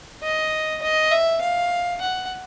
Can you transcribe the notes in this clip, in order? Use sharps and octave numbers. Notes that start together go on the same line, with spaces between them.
D#5
D#5
E5
F5
F#5